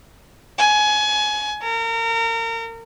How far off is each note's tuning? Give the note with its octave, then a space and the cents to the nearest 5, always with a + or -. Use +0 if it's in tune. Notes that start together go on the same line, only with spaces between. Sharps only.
G#5 +25
A#4 -30